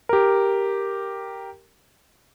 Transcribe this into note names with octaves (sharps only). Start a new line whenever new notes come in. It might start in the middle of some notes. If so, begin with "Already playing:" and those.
G4 A#4